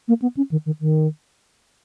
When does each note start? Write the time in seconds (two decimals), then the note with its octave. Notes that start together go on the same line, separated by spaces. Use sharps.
0.08 A#3
0.22 B3
0.37 C#4
0.51 D#3
0.66 D#3
0.81 D#3